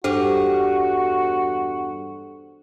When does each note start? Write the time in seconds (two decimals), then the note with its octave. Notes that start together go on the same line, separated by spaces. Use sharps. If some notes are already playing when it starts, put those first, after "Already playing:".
0.04 E2 G2 D4 F#4 G4 A4 C5